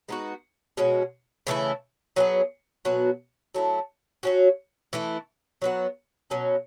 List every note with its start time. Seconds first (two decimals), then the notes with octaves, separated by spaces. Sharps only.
0.09 G#3 B3 D#4 F#4
0.77 B2 G#3 C#4 F#4
1.47 C#3 E3 A3 E4
2.16 F#3 B3 E4 G#4
2.85 B2 F#3 B3 F#4
3.54 F#3 A3 E4
4.23 F#3 C#4 F#4
4.93 E3 A3 E4
5.62 F#3 B3 F#4
6.30 B2 F#3 C#4